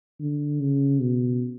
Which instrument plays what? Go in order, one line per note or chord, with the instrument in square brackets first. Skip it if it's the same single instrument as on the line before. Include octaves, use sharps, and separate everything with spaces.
[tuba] D3
C#3
B2